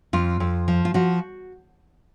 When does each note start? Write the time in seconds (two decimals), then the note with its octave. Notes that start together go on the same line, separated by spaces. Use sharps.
0.13 F2 F4
0.40 F2
0.68 F3
0.85 F4
0.94 F3 F#4